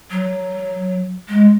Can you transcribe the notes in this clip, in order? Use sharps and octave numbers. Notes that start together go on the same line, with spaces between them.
F#3
G#3